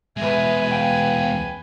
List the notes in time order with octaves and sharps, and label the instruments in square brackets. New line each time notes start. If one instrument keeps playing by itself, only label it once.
[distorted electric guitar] E2 G#3 [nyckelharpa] B4 G#5 [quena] E5
[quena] F5 [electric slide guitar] G5